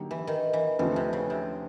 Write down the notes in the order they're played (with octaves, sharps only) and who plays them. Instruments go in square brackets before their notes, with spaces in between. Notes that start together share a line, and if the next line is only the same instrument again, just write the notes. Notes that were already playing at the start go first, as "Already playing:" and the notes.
Already playing: [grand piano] D3 F#3 A#3 D#4 G4
[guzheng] E3
D#3
E3
[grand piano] D#2 D3 F3 A3 C#4 [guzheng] E3
[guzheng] C3
C#3
C3